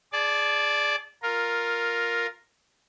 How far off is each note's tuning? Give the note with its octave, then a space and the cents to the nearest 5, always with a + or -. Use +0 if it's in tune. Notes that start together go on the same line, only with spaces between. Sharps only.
G#4 +0 D5 +0 A5 -25
F4 +10 A#4 +0